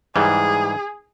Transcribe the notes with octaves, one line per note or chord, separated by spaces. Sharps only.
G#2 E3 G3 G#4